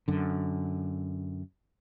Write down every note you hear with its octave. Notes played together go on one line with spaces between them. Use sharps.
F#2 D3